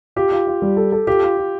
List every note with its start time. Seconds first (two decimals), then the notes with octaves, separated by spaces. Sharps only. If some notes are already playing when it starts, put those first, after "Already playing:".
0.16 F4 G4
0.32 F4
0.47 F4
0.62 G3
0.77 A4
0.92 A4
1.07 F4 G4
1.23 F4
1.37 F4